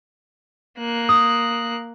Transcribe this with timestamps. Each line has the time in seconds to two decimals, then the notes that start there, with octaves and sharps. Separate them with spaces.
0.78 A#3 F#6
1.09 D#6